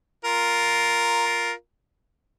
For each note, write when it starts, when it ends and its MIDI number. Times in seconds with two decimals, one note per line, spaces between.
0.25 1.52 65
0.25 1.52 70